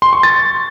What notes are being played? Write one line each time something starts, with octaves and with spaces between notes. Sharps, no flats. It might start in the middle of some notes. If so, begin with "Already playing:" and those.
C6
C#6
A6